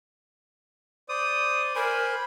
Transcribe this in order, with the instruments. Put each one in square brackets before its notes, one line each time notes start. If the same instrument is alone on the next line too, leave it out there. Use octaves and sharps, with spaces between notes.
[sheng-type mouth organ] C5 D5 [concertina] D#6
[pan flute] A#4 [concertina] C5 [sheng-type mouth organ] G#5 B5